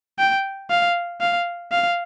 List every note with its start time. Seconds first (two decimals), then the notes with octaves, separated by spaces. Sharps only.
0.19 G5
0.70 F5
1.21 F5
1.72 F5